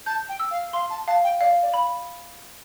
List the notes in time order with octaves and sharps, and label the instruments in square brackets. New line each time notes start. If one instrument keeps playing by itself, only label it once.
[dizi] A5 [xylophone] G6
[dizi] G5
[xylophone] E6
[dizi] F5
[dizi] F5 [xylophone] C6
[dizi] A5
[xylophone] F5 [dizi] A5
[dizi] G5
[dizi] D5 [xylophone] F5
[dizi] D5
[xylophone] B5